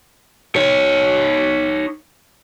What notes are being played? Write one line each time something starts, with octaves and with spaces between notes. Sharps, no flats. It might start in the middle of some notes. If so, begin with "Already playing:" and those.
D#4 C#5